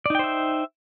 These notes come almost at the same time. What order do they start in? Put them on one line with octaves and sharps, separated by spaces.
D5 D#4 G5 C5 E5